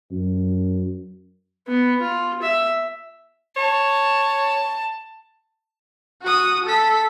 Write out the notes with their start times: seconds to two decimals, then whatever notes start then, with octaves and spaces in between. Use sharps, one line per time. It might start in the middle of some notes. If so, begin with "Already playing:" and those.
0.11 F#2
1.68 B3
2.01 F4
2.42 E5
3.56 C#5 A5
6.22 F#4 D#6
6.66 A4 B6